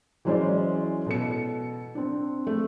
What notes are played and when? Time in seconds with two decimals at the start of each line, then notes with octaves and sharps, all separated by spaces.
0.25 E3 F#3 G#3 C#4 C5 D5
1.06 B2 A4 C#7
1.95 C4 D4
2.47 A3